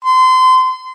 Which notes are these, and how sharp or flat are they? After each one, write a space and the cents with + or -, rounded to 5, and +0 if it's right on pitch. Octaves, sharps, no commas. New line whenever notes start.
C6 -30